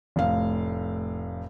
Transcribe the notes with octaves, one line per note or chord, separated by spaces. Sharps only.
F1 A2 F5